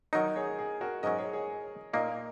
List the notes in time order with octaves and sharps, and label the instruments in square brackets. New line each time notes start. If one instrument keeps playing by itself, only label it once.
[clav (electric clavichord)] D#3 F#3 D#4 [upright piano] A#4 D#5
[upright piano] G#4 C#5
G#4
F#4 A#4
[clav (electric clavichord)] G#2 F#3 C#4 [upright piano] A#4 D#5
[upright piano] G#4 C#5
G#4 C#5
[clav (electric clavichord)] A#2 A#3 D#4 [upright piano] A#4 D#5